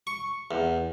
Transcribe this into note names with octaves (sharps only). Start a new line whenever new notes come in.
C#6
E2